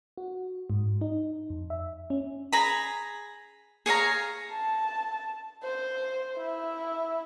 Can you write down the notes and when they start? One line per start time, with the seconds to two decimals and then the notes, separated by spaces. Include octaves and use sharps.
0.17 F#4
0.70 G#2
1.01 D#4
1.50 F2
1.70 E5
2.10 C#4
2.52 G#4 A#5 B5
3.86 G#4 C#5 F5 A#5
4.51 A5
5.63 C5
6.37 E4 E5